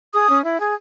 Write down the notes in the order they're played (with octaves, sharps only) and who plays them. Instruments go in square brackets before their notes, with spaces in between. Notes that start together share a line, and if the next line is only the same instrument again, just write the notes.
[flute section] G#4 D#6
C#4
E4
G#4